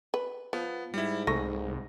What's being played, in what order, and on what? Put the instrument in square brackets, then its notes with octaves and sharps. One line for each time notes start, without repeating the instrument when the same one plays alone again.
[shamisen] B4
[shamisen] F3 [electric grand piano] B3
[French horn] G#2 [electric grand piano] G3 E4
[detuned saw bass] C2 [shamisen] A3 [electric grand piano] A#6